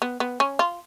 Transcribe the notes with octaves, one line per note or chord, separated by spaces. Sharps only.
B3
B3
C#4
F4